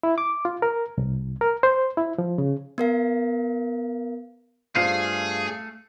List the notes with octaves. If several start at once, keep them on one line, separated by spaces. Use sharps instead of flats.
E4
D6
F4
A#4
C2
A#4
C5
E4
F3
C#3
B3 A#4 F5
G2 A3 C4 F4 G#4 F5